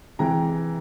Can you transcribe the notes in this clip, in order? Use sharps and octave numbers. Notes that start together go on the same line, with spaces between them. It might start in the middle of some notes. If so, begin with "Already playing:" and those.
C3 E3 G#3 G5 A#5